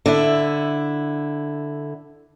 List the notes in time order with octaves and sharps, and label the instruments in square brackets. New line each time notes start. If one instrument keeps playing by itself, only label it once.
[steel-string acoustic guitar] D3 E4